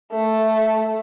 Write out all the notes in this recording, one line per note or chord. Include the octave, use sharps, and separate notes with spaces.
A3